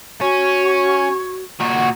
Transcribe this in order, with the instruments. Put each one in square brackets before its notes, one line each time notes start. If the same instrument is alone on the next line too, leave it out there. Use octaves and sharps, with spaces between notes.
[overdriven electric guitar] C#4 [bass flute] F#4 [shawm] C#5
[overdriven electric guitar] A#2 F#4 [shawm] C#5